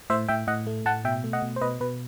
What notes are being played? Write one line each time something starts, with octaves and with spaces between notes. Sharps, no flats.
A2 C5 E5
A2 E5 G5
A2 D#5 F#5
A3
A2 F#5 A5
B2 E5 G5
A3
D#5 F#5
B2
C5
B2 B4 D#5
B2 B4